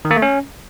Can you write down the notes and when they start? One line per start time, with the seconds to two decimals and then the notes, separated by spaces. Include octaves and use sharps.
0.05 D#3
0.11 A#3
0.16 A3
0.22 C#4